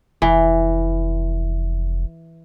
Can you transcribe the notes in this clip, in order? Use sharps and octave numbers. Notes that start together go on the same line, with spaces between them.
F1 E3